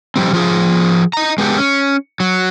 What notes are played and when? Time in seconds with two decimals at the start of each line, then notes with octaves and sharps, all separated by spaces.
0.16 F2 C3 G3 C4
0.33 F3 F4 G#4
1.13 D#5 A#5
1.38 G#3 B3 G4 A4
1.58 C#4
2.20 F#3